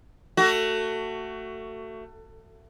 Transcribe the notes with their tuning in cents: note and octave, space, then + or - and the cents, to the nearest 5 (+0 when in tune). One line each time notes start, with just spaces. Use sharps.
A3 +25 F#4 +20